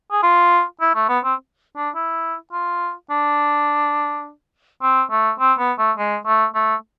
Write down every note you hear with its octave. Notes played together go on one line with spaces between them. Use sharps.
G#4
F4
E4
A3
B3
C4
D4
E4
F4
D4
C4
A3
C4
B3
A3
G#3
A3
A3